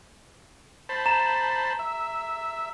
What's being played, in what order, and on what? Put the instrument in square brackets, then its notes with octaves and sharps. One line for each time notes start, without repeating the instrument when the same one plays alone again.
[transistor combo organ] C5 A5 B5
[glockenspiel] A#5 E7
[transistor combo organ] E5